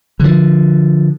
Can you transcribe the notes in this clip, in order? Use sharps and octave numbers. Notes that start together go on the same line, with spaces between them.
D3 F3